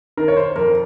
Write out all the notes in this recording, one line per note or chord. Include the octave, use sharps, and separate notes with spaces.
D#3 A#4
C#5
C5
F2 A#4